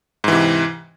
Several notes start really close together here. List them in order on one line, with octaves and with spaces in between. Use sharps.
G#2 E3 C3